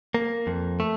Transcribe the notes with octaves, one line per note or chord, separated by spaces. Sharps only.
A#3
F2
A3